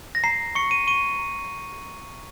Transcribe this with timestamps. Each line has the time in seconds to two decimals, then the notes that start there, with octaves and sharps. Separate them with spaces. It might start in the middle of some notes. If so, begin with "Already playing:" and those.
0.15 A#6
0.24 A#5 C7
0.55 C#6 C#7
0.71 D#7
0.87 C#6 D#7
1.19 A#5